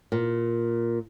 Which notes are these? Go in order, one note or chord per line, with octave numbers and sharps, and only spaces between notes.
A#2